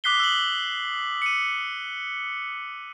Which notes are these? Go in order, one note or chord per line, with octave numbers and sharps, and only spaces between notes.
D6 D#6 F#6 B6 C7 G7
E6 F#7
C#7 D#7